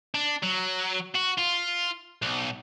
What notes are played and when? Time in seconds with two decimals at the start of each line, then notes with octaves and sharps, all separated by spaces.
0.15 D4
0.43 F#3
1.15 F#4
1.38 F4
2.22 B1